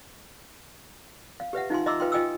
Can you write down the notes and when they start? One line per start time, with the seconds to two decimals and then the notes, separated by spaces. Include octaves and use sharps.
1.40 F5
1.53 G4 B4 E5 F#5
1.70 D#4 F4 F5 G#5 C6
1.86 D#5 E5 A#5 C6 D6 E6
2.00 F4 B4 F5 G5 C6
2.12 F4 D#5 G5 G#5 D#6 E6